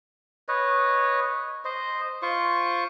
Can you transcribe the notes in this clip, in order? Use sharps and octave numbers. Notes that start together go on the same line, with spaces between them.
B4 C#5 D#5
C5 D#5
F4 C5 C#6